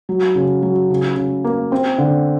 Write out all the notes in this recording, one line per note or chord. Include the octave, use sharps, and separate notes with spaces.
F#3
C#3
F#3
C#3
C#3
A#3
C4
D3